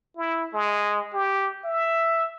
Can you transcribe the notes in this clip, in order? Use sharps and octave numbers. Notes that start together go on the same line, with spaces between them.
E4
G#3
G4
E5